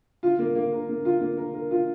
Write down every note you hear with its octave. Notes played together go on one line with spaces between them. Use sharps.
F4
A#3
A#3
A#4
A#3
F4
A#3
A#4
A#4
F4